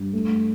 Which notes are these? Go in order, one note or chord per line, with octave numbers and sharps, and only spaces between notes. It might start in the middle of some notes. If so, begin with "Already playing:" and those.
Already playing: G2
A3